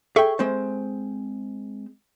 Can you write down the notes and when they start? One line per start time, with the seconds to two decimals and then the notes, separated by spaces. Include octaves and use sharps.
0.16 G#4 A4 E5 G5 C#6
0.39 G#3 C4 C5